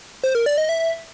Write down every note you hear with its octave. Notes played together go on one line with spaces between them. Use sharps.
C5
A#4
D5
D#5
E5